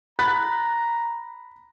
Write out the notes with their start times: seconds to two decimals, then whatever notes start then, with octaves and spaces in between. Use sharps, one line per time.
0.19 A#5 B5 F#6 A6 B6